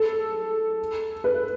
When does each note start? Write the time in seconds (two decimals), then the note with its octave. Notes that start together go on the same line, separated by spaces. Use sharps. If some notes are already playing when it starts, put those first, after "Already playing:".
Already playing: A4
1.24 B4